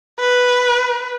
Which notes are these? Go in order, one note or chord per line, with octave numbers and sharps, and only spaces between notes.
B4